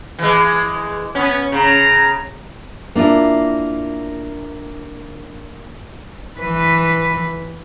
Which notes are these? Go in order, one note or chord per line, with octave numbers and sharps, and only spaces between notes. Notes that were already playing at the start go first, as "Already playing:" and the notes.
E3 G#3
B3 C#4
C#3 A#5
A#3 D4 E4 F4
E3 B4